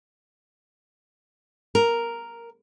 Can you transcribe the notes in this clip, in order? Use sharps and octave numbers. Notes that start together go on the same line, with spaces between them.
A#4